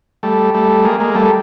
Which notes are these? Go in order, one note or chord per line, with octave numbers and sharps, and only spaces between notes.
G3 A3
G3 A3
G#3 A#3
G#3 A#3
G3 A3